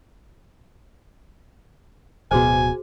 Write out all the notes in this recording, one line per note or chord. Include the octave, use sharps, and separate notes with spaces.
D1 B2 F#4 G#4 C5 G#5